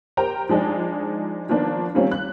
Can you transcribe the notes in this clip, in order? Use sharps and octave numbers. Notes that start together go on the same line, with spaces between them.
G4 A#4 C5 G5 A#5
F3 G#3 D4 D#4
D#3 F3 A#3 B3 D4
D#3 G3 A#3 C4 C#4 F4
F#6